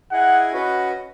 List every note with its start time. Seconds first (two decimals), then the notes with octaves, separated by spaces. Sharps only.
0.12 E4 G#4 D#5 F#5 G#5
0.52 C#4 F#4 B4 D#5 F#5